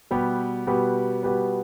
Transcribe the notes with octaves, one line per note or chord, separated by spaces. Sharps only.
B2 G3 B3 G4 B4
B2 G3 B3 G4 B4
B2 G3 B3 G4 B4